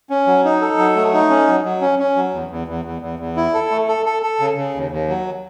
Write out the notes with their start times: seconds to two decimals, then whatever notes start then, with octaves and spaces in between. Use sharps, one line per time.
0.10 C#4
0.27 F#3
0.44 D#4
0.61 A4
0.78 F#3
0.96 A3
1.13 D#4
1.30 C#4
1.47 F#3
1.65 F#3
1.81 C#4
1.99 C#4
2.16 F#3
2.34 E2
2.50 E2
2.68 E2
2.85 E2
3.02 E2
3.19 E2
3.37 E4
3.54 A4
3.71 A3
3.88 A4
4.06 A4
4.23 A4
4.40 C#3
4.57 C#3
4.75 D#2
4.92 D#2
5.08 F#3